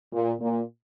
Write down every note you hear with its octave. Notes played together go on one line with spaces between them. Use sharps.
A#2
A#2